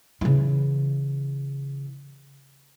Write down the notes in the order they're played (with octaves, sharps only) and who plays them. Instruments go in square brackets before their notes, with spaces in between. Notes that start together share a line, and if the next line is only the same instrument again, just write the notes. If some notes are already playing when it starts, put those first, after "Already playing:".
[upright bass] C#3 E3